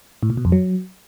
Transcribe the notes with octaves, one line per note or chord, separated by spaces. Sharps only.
A2
A#2
B2
F2
F#3